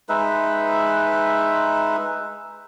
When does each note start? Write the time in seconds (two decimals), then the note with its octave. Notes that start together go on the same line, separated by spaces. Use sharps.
0.09 G#3 D#4 B4 E5